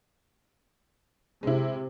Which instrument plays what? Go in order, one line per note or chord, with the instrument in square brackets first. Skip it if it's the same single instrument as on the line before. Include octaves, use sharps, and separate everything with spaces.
[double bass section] C3 [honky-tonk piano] G#3 E4